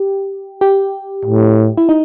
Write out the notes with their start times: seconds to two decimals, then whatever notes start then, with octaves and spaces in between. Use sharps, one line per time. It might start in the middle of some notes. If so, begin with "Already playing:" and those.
Already playing: G4
0.61 G4
1.25 A2
1.77 E4
1.89 D#4